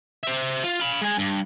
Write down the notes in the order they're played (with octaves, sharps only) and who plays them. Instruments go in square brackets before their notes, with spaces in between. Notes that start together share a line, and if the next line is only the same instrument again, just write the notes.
[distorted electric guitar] C5 E5
F4
F5 B5
G#3 G#5
G2